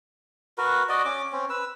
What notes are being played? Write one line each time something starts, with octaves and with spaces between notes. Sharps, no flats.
F#4 A#4 B4
F#4 D5 D#5
C#4 D6
C4 C#4
B4 E6